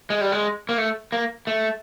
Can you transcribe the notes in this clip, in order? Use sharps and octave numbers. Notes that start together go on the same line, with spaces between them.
G#3
G3
G#3
A#3
A3
A#3
A3